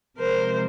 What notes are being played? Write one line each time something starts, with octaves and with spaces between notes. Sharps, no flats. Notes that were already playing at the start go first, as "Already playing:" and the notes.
C3 F3 G#3 A#4 C5